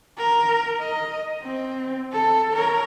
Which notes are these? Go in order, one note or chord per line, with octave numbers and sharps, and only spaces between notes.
A#4
D#5
C4
A4
A#4 C#5